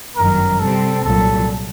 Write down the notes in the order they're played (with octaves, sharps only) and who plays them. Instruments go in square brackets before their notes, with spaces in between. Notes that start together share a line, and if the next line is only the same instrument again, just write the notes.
[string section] G1 F#2 D#3 F#3 [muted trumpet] A#4
[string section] C3 G3 C4 [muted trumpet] A4
[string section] C2 A#2 F#3 [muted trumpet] A4